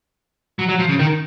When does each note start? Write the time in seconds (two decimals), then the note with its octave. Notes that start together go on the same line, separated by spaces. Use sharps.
0.59 F#3
0.69 F#3
0.79 F3
0.89 C#3
0.99 D#3